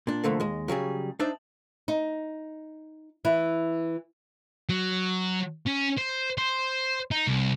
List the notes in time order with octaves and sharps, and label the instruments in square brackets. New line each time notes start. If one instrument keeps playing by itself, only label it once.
[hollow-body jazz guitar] A#2 D4
C2 D3 F3 A3 A#3
D#2 G#3
C#3 F#3 G3 G#4
D4 D#4 C5 D5 E5
[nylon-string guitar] D#4
E3 E4
[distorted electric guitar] F#3
C#4
C5
C5
D#4
C2